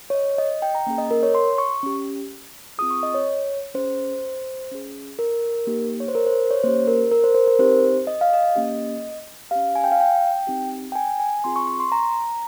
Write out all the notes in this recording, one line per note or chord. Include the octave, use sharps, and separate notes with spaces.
C#5
D#5
D#5
G5
A#5
A#3 C#4 G#4
D#5
A#4
C#5
C6
C#6
C#4 G4
C4 F4 G#4 D#6
C#6
D#5
C#5
C#4 G#4 C5
C#4 G#4
A#4
A#3 D#4 G4
C#5
C5
A#4
C5
C#5
A#3 C#4 G4 C5
A#4
A#4
C5
C5
A#4
C4 D#4 G4 C5
D#5
F5
D#5
A#3 C#4 G4
C#4 G4 F5
G#5
G5
F5
G5
C4 D#4 G4
G5
G#5
G#5
C4 F4 G#4 C6
C#6
C#6
C6
A#5